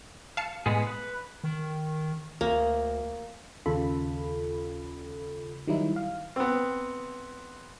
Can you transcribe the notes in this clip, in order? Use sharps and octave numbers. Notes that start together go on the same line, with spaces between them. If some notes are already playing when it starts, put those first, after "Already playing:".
F5 A5 C#7
A2 G#3 B3 G#4
B4
D#3
D2 A#3
D#2 C#3 F4 A4 B5
D#3 F#3 G3 D#4 E4
F5
B3 C4